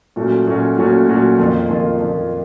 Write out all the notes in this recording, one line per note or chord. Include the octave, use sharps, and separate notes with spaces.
A#2 F#3 A3 C#4 F#4
A#2 F#3 A3 C#4 F#4
A#2 F#3 A3 C#4 F#4
A#2 F#3 A3 C#4 F#4
F2 D#3 A#3 F4
F2 D#3 A#3 F4
F2 D#3 A#3 F4